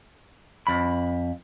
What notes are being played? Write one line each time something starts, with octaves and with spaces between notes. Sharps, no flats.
F2 B5